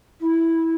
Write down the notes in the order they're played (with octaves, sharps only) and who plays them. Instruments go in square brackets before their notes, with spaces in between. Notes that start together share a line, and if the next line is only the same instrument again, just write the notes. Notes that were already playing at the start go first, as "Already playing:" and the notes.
[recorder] E4